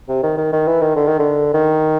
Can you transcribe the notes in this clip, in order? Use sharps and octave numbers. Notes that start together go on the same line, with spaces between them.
C3
D#3
D#3
D#3
E3
D#3
D3
D#3
D3
D#3